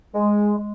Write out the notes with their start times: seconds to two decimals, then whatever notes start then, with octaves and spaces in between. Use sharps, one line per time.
0.14 G#3
0.56 G#3